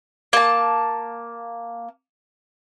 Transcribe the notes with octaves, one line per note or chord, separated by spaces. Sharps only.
A#3 A5